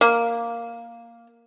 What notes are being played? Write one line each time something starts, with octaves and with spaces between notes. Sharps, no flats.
A#3